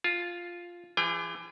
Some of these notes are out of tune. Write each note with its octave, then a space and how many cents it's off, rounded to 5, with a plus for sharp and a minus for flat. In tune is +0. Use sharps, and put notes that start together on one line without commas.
F4 +0 G#5 +40
E3 +40 G#4 -25 G5 +30